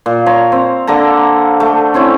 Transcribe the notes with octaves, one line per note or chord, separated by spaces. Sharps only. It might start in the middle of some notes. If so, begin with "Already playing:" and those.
A#2
C#5 A#5 C6
C4
D3 A#3 A4 A#5
A3
C4 C#4 E4 C#5